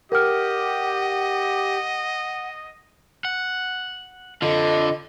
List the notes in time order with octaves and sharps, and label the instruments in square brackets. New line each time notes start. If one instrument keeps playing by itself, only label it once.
[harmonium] G4 [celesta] A#4 F6 [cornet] D#5 [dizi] F#5
[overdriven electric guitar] F#5
[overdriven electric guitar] D3 [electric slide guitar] F4 A4 [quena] D#5